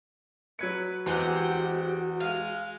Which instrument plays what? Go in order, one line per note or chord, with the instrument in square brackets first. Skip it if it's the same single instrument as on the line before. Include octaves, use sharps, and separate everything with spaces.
[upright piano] F#3 G#6 C#7 [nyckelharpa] B4
[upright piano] E2 [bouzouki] G#3 C4 G4 [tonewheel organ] F#4 [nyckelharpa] F#5 G5
[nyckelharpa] G#3 [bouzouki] F5